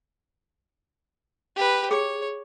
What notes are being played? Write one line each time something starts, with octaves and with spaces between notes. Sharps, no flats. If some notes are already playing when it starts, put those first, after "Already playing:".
G4 B4
G#4 C#5